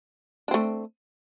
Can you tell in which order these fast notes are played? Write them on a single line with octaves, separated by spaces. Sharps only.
D4 C4 A3